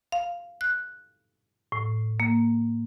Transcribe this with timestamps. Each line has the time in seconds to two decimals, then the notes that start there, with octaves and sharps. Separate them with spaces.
0.12 F5
0.61 F#6
1.72 A2
2.20 A#3